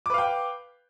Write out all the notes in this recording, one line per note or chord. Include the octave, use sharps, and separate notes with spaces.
B4 F5 G5 D6